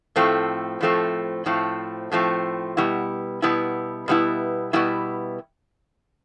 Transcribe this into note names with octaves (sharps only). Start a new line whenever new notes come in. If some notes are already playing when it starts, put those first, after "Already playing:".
A2 F3 A3 C4
A2 F3 A3 C4
A2 F3 A3 C4
A2 F3 A3 C4
B2 G3 B3 E4
B2 G3 B3 E4
B2 G3 B3 E4
B2 G3 B3 E4